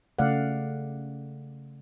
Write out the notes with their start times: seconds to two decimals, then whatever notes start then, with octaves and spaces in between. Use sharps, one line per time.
0.19 C#3 A3 D5 F5 F#5